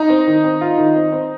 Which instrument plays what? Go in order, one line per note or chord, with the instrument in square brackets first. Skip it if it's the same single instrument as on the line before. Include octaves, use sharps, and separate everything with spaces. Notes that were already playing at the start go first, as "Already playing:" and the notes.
Already playing: [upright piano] D#4
[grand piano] C4
D#3
C4
F4
D#3
C4
C4